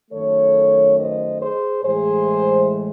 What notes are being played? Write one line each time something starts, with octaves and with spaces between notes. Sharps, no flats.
F#2 D#3 A3 A4 C#5
C5 D#5
G#4 C5
A2 E3 G#3 G#4 C5